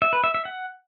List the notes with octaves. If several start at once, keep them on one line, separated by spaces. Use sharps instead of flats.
E5
B4
E5
E5
F#5